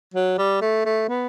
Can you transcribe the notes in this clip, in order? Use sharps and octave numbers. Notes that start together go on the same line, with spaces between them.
F#3
G3
A3
A3
B3